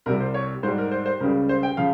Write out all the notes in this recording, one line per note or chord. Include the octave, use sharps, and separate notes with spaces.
C2 C3 G3 A#4
C5
C#5
G#2 G3 C5
A#4
C5
C5
C#2 C#3 G3 A#4
C5
G5
C#3 F3 F5